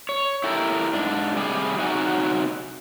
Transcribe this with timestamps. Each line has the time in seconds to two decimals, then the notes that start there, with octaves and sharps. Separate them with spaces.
0.09 C#5
0.44 E4 G4 A4 A#4
0.93 G#2 D4
1.36 C3 G3 G4 G#4
1.79 C3 F#3 D#4 F#4 F#5 G#5